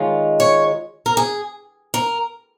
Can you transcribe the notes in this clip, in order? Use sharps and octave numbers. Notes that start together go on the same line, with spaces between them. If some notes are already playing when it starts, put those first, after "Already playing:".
Already playing: D#3 G#3 C#4 F4
C#5
A#4
G#4
A#4